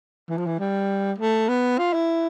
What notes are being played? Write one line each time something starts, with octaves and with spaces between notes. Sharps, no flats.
E3
F3
E3
G3
A3
B3
F4
E4